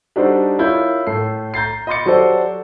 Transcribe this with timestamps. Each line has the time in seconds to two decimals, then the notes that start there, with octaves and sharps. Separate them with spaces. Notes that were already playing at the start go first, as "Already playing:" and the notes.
0.16 G3 D4 D#4 F#4 A4 C5
0.59 C#4 E4 F4 A#4 C#5 G6
1.07 A2 A4 C7
1.54 A#5 G6 A6 C7
1.87 D#5 B5 C6 D6 A6 C#7
2.06 F#3 F#4 G4 A4 C5 D5